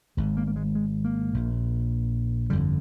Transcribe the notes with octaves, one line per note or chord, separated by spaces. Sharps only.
G#1 G#2 G#3
A#3
A#3
G#3
G#3
A#3
A#1 A#2
G1 F2 D3 G3